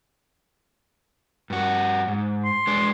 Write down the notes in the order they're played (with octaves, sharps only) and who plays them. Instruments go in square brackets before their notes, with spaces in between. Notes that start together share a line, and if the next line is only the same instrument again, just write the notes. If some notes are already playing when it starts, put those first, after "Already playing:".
[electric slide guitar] G2 F#4
G#2
[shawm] C6
[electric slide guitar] G#3 D4